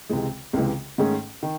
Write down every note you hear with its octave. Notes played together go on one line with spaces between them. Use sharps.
C#2 C3 E3 G#3
C#2 C3 E3 G#3
G#2 D#3 A3 C#4 G#4
D#3